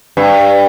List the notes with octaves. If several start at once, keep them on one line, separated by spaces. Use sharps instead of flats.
G2